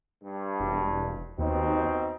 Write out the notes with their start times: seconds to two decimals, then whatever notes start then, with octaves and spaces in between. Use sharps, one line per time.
0.23 G2
0.60 E1
1.38 D#2 B2 C4 D#4